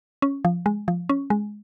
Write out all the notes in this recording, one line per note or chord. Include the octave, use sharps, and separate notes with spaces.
C#4
F3
G#3
F3
C#4
G#3